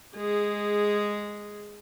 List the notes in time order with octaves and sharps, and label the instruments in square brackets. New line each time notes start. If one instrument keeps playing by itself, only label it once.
[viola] G#3 G#4